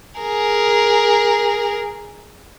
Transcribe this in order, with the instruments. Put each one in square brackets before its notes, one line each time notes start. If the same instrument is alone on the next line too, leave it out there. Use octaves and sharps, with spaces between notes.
[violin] G#4 A#4